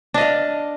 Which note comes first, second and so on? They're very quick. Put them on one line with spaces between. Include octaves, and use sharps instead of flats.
D4 D#5 F5